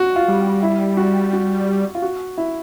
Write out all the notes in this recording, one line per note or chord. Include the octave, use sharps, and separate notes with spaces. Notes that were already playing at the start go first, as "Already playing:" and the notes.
Already playing: F#4
F4
G3
E4
F#4
F#4
F4
F#4
E4